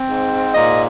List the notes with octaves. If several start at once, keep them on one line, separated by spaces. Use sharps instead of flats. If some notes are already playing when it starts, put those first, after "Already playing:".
Already playing: C4
G#2
A#2 D#5